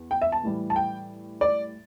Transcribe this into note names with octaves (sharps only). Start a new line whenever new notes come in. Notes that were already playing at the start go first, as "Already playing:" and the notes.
Already playing: E2
G5
E5
A5
A2 E3 G3
A5
G5
D5